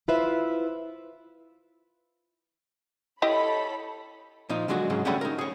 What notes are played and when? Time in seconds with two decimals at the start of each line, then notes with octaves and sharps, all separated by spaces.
0.08 E4 F4 B4 C5 E5
3.22 E4 G4 A4 C#5 D#5 B5
4.49 A#2 F3 D#4 F4
4.68 D3 F#3 G#3 D4 F#4
4.90 G#2 C#3 F#3
5.05 D3 G3 A3 C#4 F#5 B5
5.21 D#4 A#4
5.39 G#4 C#5